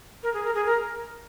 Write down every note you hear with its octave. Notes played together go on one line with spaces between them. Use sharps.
A#4
G#4
A#4
G#4
A#4